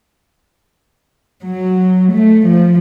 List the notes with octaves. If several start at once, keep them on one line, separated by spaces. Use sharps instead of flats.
F#3
A3
F3